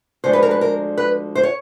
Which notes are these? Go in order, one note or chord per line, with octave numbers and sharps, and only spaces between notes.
D2 D3 F3 G#3 C5
B4
A#4
B4
A#4
B4
C5
C#5